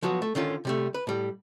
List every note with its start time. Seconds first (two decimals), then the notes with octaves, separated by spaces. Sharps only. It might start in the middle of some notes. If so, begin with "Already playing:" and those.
0.02 F3 F#3 B3 F#4
0.22 A3
0.35 D3 D#3 C#4 F4
0.65 C3 G3 A3
0.94 B4
1.07 A2 G3